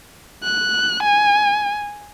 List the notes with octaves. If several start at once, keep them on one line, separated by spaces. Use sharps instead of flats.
F#6
G#5